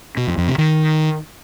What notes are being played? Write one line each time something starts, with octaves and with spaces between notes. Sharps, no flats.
B2
F2
F2
C3
D#3